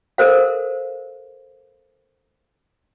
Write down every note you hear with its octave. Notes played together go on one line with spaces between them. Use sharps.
A4 A#4 C5 F5